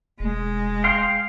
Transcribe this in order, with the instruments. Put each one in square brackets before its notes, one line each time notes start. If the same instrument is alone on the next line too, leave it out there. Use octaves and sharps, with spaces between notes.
[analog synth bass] E1 [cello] G#3
[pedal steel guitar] F5 G5 C6